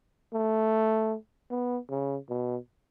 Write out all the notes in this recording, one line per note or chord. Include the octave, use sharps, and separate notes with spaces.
A3
B3
C#3
B2